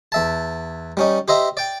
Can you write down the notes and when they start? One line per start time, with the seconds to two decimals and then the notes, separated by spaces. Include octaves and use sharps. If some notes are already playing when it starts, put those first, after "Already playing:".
0.12 E2 E5 A5
0.97 G3 C#4 D#4
1.28 G4 C5 D#5 E5 A#5
1.57 D5 G5